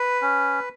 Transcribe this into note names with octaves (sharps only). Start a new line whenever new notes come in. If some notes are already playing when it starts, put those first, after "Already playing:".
Already playing: B4
C#4